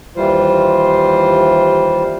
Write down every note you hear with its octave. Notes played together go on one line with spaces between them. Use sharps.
D#2 E3 G3 F4 C5